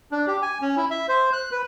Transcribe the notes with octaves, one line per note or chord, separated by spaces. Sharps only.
D4
G4
G#5
C#4
E4
E5
C5
F#6
B4